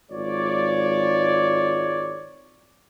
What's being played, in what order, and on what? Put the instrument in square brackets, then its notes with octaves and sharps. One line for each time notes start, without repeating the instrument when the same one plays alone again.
[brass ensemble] G#1 G#3 F4 C#5 D5